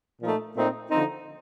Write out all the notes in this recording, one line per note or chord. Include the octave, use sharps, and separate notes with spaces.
A#2 F3 A3 D#4
A#2 A3 C4 D#4
D3 F3 C4 D#4